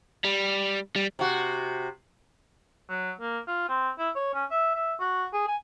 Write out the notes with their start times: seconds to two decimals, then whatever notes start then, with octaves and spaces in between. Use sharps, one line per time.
0.25 G3
0.96 G3
1.19 C3 F#4
2.89 F#3
3.21 A#3
3.48 F4
3.69 C4
3.98 E4
4.15 C#5
4.34 C#4
4.51 E5
4.75 E5
5.00 F#4
5.33 G#4
5.48 G#5